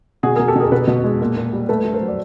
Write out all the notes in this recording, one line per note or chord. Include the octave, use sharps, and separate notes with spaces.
B2 F#4 G#4
B2 G#4 A#4
G4 A4
B2 G#4 A#4
B2 A4 B4
B2
G#3
A#2
A#2
G3
A3 A4 B4
A3
A#4 C5
F#3
D5